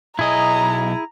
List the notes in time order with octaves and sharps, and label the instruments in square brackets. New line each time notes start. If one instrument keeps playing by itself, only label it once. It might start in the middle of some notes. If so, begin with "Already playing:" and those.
[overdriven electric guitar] B1 D#5 [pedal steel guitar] E4 G#4 [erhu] A#5